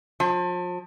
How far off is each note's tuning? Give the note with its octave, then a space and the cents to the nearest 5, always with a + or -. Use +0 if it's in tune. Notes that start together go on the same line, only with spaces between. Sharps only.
F3 +35